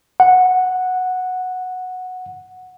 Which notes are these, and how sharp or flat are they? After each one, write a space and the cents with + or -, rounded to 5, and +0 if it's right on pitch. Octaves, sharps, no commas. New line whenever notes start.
F#5 -5